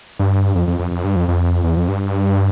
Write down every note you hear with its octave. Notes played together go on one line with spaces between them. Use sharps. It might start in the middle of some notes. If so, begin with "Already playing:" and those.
G2
F2
F2
F2
F2
G2
F2
F2
E2
F2
G2